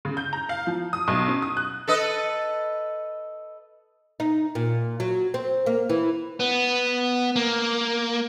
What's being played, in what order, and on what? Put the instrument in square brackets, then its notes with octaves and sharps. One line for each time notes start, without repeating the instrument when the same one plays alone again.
[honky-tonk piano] C#3
G6
A#5
F5
F3
D#6
B1
C#4
D#6
F#6
[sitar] A4 B4 D#5
[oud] D#4
A#2
F#3
C4
A#3
E3
[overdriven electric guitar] B3
A#3